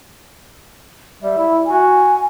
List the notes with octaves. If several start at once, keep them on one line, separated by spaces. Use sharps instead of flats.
G3 E5
E4
F#4 G#5